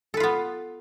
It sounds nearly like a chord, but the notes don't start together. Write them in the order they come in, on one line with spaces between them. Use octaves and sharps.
A4 B4 F4 B3